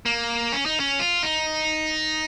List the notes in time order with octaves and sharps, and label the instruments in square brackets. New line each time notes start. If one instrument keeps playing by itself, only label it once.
[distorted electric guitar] A#3
C#4
D#4
C#4
F4
D#4